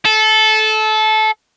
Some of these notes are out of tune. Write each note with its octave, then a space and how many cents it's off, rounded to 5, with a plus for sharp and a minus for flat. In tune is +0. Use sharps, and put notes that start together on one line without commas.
A4 -20